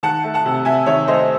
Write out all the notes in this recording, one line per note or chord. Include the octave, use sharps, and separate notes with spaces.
D#3 F#5 A5
A3
F#5 A5
C3
C3 E5 G#5
D#3 C#5 E5
A3 C5 D#5